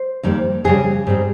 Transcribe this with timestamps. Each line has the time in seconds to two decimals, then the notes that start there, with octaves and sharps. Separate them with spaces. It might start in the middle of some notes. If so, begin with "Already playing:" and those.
Already playing: C5
0.23 F2 D#3 G3 A#3
0.64 F2 C#3 G3 G#4
1.07 G#2 G3 C4